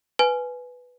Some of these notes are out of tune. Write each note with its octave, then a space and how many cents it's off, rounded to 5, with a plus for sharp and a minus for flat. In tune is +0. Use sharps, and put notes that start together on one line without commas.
B4 +0 G#5 +15